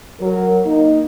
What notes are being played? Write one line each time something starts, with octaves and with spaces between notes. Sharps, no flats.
F#3 A#4
A#3 D#4